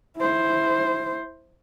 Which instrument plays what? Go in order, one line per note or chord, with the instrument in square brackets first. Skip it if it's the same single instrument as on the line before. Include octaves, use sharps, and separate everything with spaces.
[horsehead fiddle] E4 C5